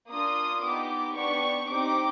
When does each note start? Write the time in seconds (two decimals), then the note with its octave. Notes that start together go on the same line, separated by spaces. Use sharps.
0.09 A#3 D4 F4 D#6
0.61 B3 D#4 G4 D6
1.15 B3 D4 G4 C#6
1.69 C4 D#4 G4 D6